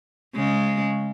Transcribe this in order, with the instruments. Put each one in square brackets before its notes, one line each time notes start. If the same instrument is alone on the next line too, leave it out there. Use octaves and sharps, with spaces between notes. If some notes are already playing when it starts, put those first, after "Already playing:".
[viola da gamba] C#3 G#3